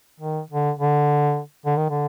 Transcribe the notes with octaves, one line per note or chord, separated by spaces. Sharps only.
D#3
D3
D3
D3
D#3
D3